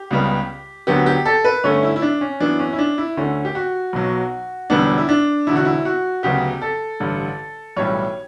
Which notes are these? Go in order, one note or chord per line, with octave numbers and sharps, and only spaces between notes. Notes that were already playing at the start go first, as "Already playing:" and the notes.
Already playing: G4
C#2 C#3 G3 B3
D2 D3 F#3 B3 G4
G4
A4
B4
G2 D3 A3 C#4 C#5
E4
E4
D4
C#4
F#2 E3 B3 D4
C#4
E4
D4
E4
D2 D3 A3 C#4
G4
F#4
B1 B2 F#3
E1 E2 D3 G3 B3 D4
E4
D4
E1 E2 D3 E4
F#4
E4
F#4
D2 C#3 F#3 B3 G4
A4
A1 G2 D3
B1 A2 E3 G3 C#5